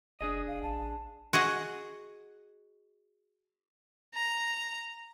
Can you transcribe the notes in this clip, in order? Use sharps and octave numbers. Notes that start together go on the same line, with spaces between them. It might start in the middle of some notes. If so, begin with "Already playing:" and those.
F#1 D4 G#4 D#5 D#6
F1 F5
A1 A5
F#4 G#4 D#5 F#5
A#5